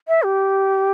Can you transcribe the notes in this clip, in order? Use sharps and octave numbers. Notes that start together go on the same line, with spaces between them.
E5
G4